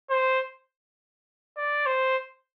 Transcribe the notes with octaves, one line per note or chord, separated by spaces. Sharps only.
C5
D5
C5